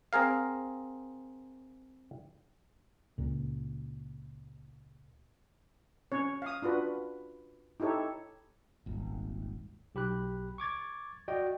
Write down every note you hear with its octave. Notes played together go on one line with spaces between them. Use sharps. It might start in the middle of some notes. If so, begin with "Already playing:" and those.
C4 G#4 A#4 F5
C#2 A#2
C#4 C#5
F5 D#6
D4 F4 F#4 B4
D#4 E4 G4 A4 C#5
D#1 G#1
B1 G4 B5 F#6
C#6 D6 G#6 A6
F#4 D5 D#5 G5